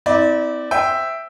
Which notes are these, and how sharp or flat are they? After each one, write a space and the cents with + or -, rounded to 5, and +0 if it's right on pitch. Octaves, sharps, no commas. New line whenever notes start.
C4 -40 E4 -40 D5 +0
C5 +0 E5 +0 G5 +0